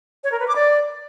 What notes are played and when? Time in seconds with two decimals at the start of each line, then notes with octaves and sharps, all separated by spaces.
0.24 C#5
0.32 A#4
0.40 B4
0.48 D6
0.56 D5